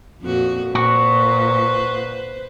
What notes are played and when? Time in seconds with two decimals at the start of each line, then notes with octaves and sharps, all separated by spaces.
0.22 F2 A#2 F#4
0.75 A#2 F#4 B4 C5